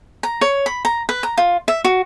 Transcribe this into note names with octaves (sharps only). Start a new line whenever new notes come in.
A#5
C#5
B5
A#5
B4
A#5
F4
E5
F#4